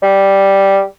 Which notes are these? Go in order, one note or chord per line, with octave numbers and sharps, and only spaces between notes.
G3